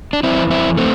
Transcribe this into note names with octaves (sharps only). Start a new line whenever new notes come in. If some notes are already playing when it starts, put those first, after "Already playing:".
D4
F2 E3 C4 E4
C4 E4
A3 C4